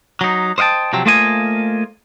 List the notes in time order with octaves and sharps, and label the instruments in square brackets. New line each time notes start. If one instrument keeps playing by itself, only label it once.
[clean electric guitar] F#3 D#4
C5 D#5 F5 G5 A5
C3 F3 F#3 C4
A3 A#3 F4 C5 D#5 G#5